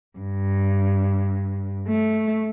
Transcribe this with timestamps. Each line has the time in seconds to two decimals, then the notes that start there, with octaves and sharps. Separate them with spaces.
0.19 G2
1.88 A3